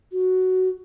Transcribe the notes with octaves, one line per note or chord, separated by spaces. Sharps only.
F#4